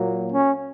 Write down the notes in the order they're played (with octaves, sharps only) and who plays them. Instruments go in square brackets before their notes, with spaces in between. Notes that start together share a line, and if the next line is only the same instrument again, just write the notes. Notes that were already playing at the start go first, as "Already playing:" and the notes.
Already playing: [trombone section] A#2 F#3 A#3
C#4